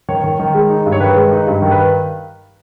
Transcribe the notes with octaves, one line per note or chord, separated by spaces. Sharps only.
D#3 C#5
D#3
D#3
G#3
D#4
G2
C#5
D#3 B4
G#3
D#4
G2
D#3
B4